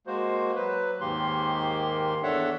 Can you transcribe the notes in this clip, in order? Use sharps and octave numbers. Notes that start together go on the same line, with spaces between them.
G#3 A#3 F#4 C5
F#3 B4
D#2 G#2 D#3 A#3 G4 C6
E2 D4 A4 C#5 E5 F#5